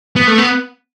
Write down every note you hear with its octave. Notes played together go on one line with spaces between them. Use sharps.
B3
A3
B3